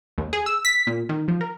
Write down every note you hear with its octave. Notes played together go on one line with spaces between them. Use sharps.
D#2
G#4
E6
B6
A#2
D#3
F3
A#4